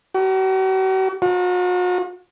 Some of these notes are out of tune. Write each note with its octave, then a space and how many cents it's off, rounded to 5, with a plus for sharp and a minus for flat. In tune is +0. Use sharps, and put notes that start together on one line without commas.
F#4 +45
F#4 -40